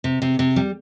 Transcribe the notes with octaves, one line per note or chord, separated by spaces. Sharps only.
C3
C3
C3
G3